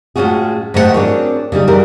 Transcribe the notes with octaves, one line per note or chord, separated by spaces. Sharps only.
A2 G#3 C#4 F4 F#4 G#4
G#2 D#3 A3 A#4 F#5
C4 D4 F#4 G#4 A#4 C#5
C#3 G3 D#4 G#4
E3 G3 F#4 A#4